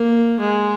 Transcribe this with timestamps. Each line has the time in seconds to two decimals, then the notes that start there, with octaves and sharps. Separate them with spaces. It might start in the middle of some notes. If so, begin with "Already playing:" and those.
Already playing: A#3
0.39 G#3